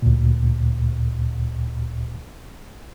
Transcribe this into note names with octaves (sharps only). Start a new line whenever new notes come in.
D2 A#2